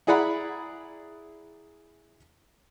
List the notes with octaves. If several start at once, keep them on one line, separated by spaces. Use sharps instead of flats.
E4 G#4 D5 F#5 A#5 B5